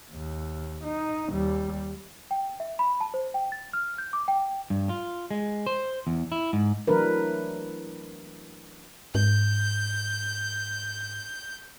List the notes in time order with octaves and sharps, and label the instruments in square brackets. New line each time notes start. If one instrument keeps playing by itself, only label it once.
[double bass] D#2
D#4
D#2 G3
[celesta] G5
E5
B5
A5
C5
G5
A6
F6
G6
D6
G5
[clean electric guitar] G2
F4
G#3
C5
E2
E4
G#2
[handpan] E3 F#3 A3 D4 A#4 B4
[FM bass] G#2 [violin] G6